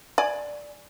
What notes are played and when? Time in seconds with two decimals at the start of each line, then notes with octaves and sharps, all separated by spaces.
0.18 D5 G#5